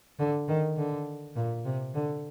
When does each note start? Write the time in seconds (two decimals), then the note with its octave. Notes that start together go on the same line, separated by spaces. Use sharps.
0.19 D3
0.48 D#3
0.77 D3
1.36 A#2
1.65 C3
1.94 D3